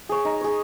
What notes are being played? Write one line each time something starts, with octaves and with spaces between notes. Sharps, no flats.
G#4 C#5
D#4
G#4 C#5